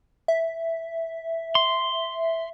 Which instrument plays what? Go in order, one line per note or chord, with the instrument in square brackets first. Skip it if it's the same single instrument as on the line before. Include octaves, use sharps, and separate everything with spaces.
[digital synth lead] E5
[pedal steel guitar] C6